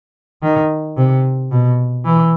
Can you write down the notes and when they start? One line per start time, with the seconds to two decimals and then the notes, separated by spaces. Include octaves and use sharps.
0.42 D#3
0.97 C3
1.51 B2
2.05 E3